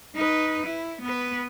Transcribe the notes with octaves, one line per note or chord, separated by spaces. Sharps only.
D#4 B4
E4
B3 B4